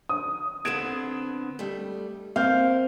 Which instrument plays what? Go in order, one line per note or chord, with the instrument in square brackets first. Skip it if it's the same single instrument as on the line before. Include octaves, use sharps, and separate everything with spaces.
[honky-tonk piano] D#6
[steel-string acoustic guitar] D3 B3 C4 [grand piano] G#6 D7 E7
[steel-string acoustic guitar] G3 A3
[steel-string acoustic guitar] A#3 [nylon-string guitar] C4 [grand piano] F5 F6 G6